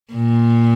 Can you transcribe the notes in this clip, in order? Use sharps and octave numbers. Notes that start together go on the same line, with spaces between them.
A#2